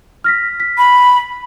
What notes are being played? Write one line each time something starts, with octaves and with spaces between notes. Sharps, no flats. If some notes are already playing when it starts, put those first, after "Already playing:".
F6 A#6 B6
B6
B5